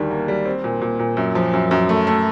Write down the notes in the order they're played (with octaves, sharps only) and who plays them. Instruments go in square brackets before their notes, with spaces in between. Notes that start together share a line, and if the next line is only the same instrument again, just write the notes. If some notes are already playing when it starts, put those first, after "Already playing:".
Already playing: [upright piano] D2 D#3 G3
A#3
G3
C4
A#2
A#2
A#2
F#2
F3
F#2
F#2
A3
A3